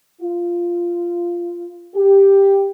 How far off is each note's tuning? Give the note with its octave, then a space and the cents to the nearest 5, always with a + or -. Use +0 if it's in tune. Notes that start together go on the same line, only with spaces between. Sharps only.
F4 -10
G4 +5